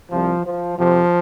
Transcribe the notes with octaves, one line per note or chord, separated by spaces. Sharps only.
C2 C3 F3
F3
F2 C3 F3